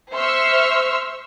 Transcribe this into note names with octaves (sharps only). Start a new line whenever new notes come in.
C5 E5 C6 C#6 E6 F6